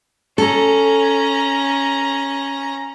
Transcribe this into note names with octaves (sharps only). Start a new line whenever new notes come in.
C#4 A4 A#5